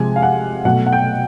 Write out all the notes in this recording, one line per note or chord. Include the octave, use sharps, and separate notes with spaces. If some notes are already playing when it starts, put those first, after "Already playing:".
Already playing: C3 F3 G#3 G#5
F5
F#5
B2 F#3 A3 F#5
F#5
G5